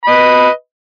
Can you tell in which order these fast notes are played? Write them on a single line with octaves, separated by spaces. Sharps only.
B5 D#5 B4